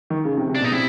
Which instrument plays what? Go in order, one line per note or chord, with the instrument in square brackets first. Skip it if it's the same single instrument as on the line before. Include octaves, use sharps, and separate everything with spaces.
[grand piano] D#3
C#3
C3
C3
[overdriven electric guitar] D4
[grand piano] B2
[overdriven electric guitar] D#4
[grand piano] C3 [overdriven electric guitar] E4